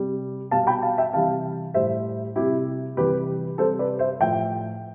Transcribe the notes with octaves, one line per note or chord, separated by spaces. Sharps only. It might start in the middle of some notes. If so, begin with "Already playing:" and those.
Already playing: C3 G3
B2 G3 F5 A5
G5 B5
F5 A5
E5 G5
C3 E3 G3 F5 A5
A2 G3 C5 E5
C3 G3 E4 G4
C3 E3 G3 G4 B4
C3 G3 A4 C5
B4 D5
C5 E5
A2 F3 E5 G5